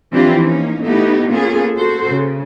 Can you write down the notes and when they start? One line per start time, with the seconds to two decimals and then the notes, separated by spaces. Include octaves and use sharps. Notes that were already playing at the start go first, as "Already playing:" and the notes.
0.12 E3 F3 C4 D4 F4 G4
0.44 A#3 C#4 D#4
0.84 A3 B3 D#4 E4 G4
1.29 A#3 B3 C#4 F4 G#4 A4
1.76 F#4 A4 C5
2.08 C#3